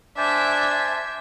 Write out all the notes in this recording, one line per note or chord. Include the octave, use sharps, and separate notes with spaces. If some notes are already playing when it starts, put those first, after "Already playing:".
D4 C5 E5 G#5 A5